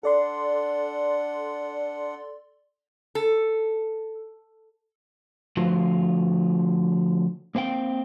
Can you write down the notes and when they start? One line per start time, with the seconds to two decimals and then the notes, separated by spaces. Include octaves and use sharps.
0.03 D4 A4 D5 F#5 C6
3.15 A4
5.57 D3 F3 A3 F4 F#4 B4
7.55 A#3 C4 F5 G5